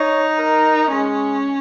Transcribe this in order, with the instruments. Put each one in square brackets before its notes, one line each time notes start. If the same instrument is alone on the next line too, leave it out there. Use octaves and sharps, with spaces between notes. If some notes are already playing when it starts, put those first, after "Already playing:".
Already playing: [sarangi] D#4 [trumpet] C#5
[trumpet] A#4
[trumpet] G#3 [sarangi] C#4